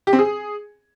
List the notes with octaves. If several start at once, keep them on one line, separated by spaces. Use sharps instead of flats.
G4
C4
G#4